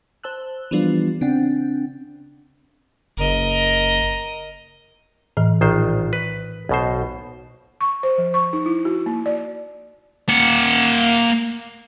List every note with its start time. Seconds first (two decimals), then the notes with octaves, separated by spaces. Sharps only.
0.24 C5 A5 E6 F#6
0.71 E3 F3 G3 B3 D4 F4
1.21 C#3 C4 D4 F#5 G5
3.17 F#1 A#4 D#5
5.37 A2 E3
5.61 A#1 D#3 C5
6.13 B4
6.69 B1 B2 C5
7.81 C#6
8.03 C5
8.18 F3
8.34 C#6
8.53 D#4
8.66 E4
8.85 F#4
9.06 A#3
9.26 D5
10.29 A#3 F#5